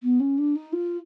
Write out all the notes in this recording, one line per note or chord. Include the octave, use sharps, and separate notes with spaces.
B3
C#4
D4
D#4
F4